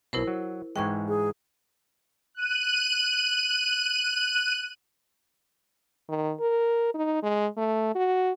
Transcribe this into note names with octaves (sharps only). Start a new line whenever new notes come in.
B1 B2 E4 A#4 C5
F#3
G#2 E3 G#3 G5 C#6 G#6
G#4
F#6 D#7
D#3
A#4
D#4
G#3
A3
F#4